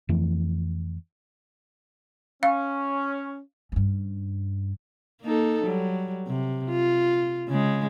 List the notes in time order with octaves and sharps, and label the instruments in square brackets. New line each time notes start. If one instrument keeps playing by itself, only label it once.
[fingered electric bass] F2 E3 A3
[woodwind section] C#4 [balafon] F5
[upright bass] G2 C#4
[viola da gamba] A#3 D#4 A4
F#3 G3
C3
F4
C#3 G#3